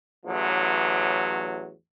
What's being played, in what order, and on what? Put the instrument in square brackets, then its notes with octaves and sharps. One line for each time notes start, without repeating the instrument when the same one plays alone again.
[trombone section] A1 E2 F#3